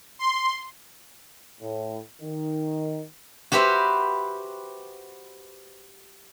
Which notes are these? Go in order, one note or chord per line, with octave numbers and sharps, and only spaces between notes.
C6
A2
D#3
F#4 G4 B4 C5 E5